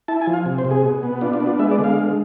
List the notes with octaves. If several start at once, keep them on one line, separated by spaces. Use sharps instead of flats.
E4 A5
G#5
F3
F5
C3
C5
C3
G#4
B2
B3
D4 F4
F4
B3
F4
G#3 E5
D5
D3
F5
G#3